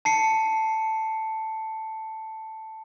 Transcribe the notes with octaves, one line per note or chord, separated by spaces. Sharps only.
A5 C7 C#7